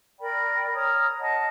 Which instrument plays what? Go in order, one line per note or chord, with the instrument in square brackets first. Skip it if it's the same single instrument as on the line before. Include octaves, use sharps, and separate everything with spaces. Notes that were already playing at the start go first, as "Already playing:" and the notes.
[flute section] A#4 D5 G5 B5
C#5 A#5 D#6 F6
D#5 F#5 A5